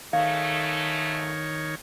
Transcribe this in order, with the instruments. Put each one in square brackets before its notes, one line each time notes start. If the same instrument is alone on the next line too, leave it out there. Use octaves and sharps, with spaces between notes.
[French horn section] G#2 A3 [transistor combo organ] D#3 C#5 [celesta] F5